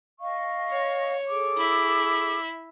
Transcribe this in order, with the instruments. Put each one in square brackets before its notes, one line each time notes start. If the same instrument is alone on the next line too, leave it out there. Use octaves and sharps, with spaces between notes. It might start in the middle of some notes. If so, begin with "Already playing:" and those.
[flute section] D#5 F5 C#6
[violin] C#5
[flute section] G#4 A4 D6
[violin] E4 E5